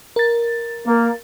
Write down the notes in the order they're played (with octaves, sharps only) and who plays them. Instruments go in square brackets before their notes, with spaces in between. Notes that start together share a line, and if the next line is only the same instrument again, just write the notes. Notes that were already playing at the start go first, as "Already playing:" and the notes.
[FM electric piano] A#4 A6
[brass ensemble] A#3